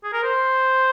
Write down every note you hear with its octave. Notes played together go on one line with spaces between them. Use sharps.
G#4
A#4
C5